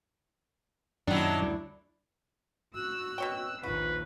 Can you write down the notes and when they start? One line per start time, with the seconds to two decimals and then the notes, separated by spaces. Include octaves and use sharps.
1.07 F#2 A#2 D#3 F#3 D4 E4
1.42 D2 G3
2.75 F#4 E6 F#6
3.18 B2 C#5 G5
3.63 A#1 D#2 F4 F#4 B4